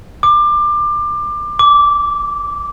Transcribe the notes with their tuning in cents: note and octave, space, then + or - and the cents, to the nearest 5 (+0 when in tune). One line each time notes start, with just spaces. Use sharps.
D6 +25
D6 -10